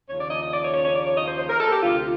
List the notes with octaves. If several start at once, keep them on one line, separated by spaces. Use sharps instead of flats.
D#2 C#3 F3 C#5
D5
D#5
D#5
D5
C#5
C#5
C#5
D5
C#5
D#5
C5
C5
A#4
A4
G4
D2 C3 F3 F4